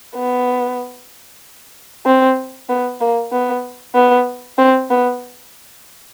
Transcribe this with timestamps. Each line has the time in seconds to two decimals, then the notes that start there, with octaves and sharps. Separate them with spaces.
0.16 B3
2.06 C4
2.69 B3
3.00 A#3
3.32 B3
3.95 B3
4.58 C4
4.90 B3